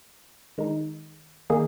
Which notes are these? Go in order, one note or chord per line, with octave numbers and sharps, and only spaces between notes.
D#3 G#3 D#4
D#3 A#3 D#4 G#4